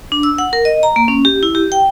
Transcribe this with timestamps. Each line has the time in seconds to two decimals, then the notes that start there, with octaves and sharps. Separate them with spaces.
0.12 D4
0.23 E6
0.38 F#5
0.53 A#4
0.65 D#5
0.83 A#5
0.96 A#3
1.08 C#4
1.25 G4
1.43 E4
1.55 G4
1.72 G5